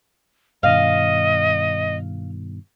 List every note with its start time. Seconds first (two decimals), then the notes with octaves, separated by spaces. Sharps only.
0.63 G2 B2 D#3 D#5 F5